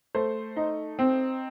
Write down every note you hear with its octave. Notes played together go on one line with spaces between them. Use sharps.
A3 C5
D#4
C4